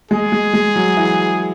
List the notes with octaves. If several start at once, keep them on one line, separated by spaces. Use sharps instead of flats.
G#3 G#4
G#3
G#3
F#3
E3